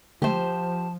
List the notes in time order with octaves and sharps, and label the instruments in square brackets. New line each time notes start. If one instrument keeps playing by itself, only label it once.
[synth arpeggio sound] D3 G#3 A3 [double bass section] F3 [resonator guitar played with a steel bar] G4 C5 [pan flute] A5